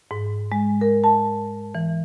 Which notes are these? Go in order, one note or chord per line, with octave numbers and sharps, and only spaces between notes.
G#2
G#3
A#4
A5
E3